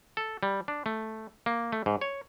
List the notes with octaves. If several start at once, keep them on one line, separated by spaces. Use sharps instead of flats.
A4
G3
D4
A3
A#3
A3
G#2
C#5